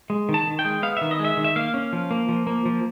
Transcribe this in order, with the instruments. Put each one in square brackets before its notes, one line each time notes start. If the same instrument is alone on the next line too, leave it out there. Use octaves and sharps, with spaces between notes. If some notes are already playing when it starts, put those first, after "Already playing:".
[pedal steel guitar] G#3
D#3
A5
D#3
G5
G#3
B3 F5
D#3 E5
D#5
G#3
E5
D#3
E5
A#3 F5
C#4
F3
A#3
F3
A#3
F3